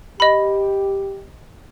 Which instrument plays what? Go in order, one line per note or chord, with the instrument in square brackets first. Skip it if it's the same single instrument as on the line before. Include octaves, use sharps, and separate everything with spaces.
[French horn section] G4 [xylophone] D#5 B5